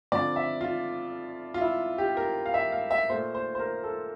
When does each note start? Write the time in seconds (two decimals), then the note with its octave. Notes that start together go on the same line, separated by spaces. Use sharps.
0.12 F2 D3 F3 D5
0.36 E5
0.61 F4
1.54 F4
1.61 E4
1.98 G4
2.17 A#4
2.46 F5
2.54 E5
2.72 F5
2.91 E5
3.10 A#2 A3 C5
3.35 C5
3.55 C5
3.59 A#4
3.83 A4